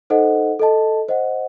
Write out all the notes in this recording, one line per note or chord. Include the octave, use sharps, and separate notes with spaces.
D#4 A4 C5 D#5 F#5
A4 D#5 A5
C5 D#5 F#5